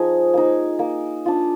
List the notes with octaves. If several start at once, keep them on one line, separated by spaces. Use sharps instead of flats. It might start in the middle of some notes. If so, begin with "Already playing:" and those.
Already playing: F3 D#4 G#4 G#5
A#3 D#4
A#3
D4 F4